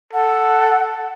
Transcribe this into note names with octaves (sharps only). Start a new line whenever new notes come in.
A4 F#5